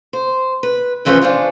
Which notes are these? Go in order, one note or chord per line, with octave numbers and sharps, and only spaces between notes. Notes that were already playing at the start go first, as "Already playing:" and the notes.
C5
B4
D2 E3 F3 C#4 B4 C5
D4 F4 G#4 C5 C#5